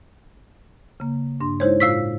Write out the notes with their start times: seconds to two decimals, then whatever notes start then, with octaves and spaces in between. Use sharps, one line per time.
1.00 C#3 A#3
1.40 G2 D4 C6
1.60 G#3 D#4 E4 C5 C#5
1.80 A2 F4 F5 E6 B6